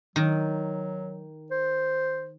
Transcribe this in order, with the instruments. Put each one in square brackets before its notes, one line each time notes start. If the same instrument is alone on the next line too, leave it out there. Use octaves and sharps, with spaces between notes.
[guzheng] D#3 [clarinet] F#3
[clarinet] C5